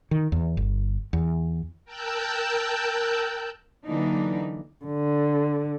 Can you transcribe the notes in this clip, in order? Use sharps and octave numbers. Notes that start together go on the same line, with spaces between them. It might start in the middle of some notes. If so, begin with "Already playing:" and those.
D#3
E2
G1
E2
A#4 G5 A5 E6 F#6 G6
D3 E3 F#3 A#3 D4 D#4
D3